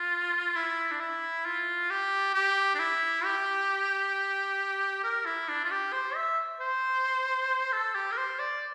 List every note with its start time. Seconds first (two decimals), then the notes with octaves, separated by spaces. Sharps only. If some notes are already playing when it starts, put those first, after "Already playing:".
Already playing: F4
0.56 E4
0.91 D4
1.00 E4
1.45 F4
1.90 G4
2.34 G4
2.75 D4
2.79 E4
3.25 G4
5.03 A#4
5.25 E4
5.48 D4
5.64 F4
5.71 G4
5.92 C5
6.15 E5
6.60 C5
7.72 A4
7.95 G4
8.12 A#4
8.17 C5
8.39 D5